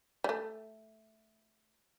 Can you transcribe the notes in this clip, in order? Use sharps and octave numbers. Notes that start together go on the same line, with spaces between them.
G3
A3